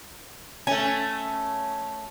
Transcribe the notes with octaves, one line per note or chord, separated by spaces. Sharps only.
A3 C#4 G#5